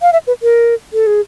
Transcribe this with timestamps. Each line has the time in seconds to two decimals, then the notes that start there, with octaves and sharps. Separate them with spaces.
0.02 F5
0.13 E5
0.27 B4
0.43 A#4
0.93 A4
1.07 G#4